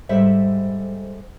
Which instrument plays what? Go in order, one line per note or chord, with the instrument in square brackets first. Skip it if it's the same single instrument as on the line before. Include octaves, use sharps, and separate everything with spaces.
[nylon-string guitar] G#2 G3 A4 C5 E5